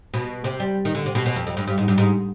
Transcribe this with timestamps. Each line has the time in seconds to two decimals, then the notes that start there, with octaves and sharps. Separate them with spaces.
0.14 B2
0.44 C3
0.60 G3
0.85 D#3
0.95 D3
1.06 C3
1.15 B2
1.26 B2
1.36 F2
1.47 F2
1.57 G2
1.67 G2
1.78 G#2
1.88 G2
1.98 G#2